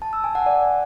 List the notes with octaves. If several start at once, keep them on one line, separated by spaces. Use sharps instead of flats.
A5
E6
G#5
F#5
D5